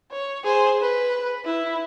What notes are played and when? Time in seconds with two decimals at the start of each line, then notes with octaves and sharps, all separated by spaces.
0.12 C#5
0.44 G#4 C5
0.82 B4
1.45 E4